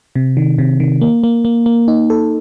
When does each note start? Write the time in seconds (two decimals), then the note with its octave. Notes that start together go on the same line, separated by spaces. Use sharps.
0.16 C3
0.37 D#3
0.58 C3
0.80 D#3
1.01 A#3
1.24 A#3
1.45 A#3
1.66 A#3
1.88 D#4
2.10 A4